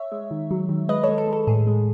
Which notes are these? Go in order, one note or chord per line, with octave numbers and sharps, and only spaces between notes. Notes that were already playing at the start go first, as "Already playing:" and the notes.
Already playing: C#5 E5
G#3
D#3
F#3
D#3
G#3 B4 D#5
A4 C#5
G#3
A4
G#3
A4
A2 G#4
G#3